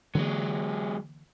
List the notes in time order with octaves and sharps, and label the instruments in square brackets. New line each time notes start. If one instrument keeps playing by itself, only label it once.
[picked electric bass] D3 E3 A#3 [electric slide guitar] F#3 G#3